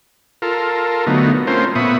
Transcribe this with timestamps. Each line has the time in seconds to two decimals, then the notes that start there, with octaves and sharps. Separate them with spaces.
0.42 F4 A4 A#4
1.07 D3 F#3 A3 B3 D#4
1.47 A3 C4 C#4 F4 A#4 C5
1.75 A#2 B3 E5 B5 C#6 D#6